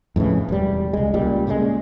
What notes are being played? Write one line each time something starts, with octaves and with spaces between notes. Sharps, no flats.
F2 A2 C#3 E3
E1 G3
C#2 G#3
C#2 A#2 G3
A#2 C#3 E3 G#3